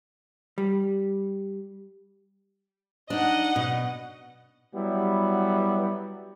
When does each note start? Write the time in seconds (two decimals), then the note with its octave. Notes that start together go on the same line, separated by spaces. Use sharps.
0.58 G3
3.10 D4 D#4 D#5 F#5
3.56 B2
4.75 F#3 G3 B3 E4